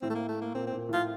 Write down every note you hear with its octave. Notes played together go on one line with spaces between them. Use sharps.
A2 C4
A3
A#3
A3
A#3
A#2 C4
C4
A#2
A2 F4